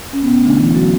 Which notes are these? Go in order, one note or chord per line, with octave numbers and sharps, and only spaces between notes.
C#4
B2 B3
A3
D3 D4
B2 E3 E4
F#3 A3 F#4